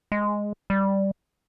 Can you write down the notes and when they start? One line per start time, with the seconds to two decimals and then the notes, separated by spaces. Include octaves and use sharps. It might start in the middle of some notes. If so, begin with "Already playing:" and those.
0.12 G#3
0.70 G3